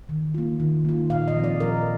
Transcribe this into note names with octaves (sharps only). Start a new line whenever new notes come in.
D#3
A#3 F4
D#3
A#3 F4
A#2 F5
D#5
F3 C4
D5
A#2 A#4